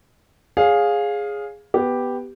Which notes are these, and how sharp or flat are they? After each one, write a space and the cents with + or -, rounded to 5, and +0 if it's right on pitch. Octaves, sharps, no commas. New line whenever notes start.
G#4 -5 C#5 +10 F5 +15
B3 +0 G4 +0